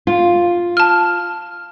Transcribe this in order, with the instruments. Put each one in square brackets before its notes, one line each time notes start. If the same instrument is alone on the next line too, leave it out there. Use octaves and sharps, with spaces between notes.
[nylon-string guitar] F4
[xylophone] A5 F6